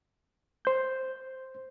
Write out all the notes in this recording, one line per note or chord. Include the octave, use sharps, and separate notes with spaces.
C5 G6